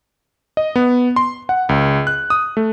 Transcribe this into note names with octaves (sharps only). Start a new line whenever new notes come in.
D#5
B3
C6
F#5
C#2
F#6
D#6
A3